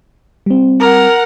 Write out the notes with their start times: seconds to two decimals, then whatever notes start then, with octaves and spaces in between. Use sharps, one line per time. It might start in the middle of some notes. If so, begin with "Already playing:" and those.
0.46 G3 C4
0.80 A#4 F#5